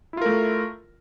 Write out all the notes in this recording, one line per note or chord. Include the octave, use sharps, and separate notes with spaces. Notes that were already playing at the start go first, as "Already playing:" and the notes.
A3 E4 F4 A#4